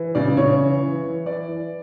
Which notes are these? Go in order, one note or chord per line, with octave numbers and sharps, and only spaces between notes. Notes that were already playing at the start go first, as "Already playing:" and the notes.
Already playing: E3
C#3 D5
C#3 C#5
E3
E3
E3
E3 D5
E3